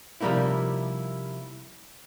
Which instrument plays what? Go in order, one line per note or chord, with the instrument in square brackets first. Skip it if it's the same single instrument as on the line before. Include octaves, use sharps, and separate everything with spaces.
[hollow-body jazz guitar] C3 F3 G3 A#3 D#4 E4